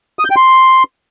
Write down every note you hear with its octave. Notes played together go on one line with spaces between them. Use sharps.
D#6
G6
G5
C6